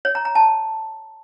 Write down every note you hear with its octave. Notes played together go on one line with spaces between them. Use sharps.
C#5
A#5
A#5
A5